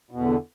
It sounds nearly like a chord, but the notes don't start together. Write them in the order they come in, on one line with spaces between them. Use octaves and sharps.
B2 E2 D3